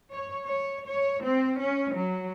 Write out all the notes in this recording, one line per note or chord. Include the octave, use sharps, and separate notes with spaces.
C#5
C#5
C#5
C4
C#4
F#3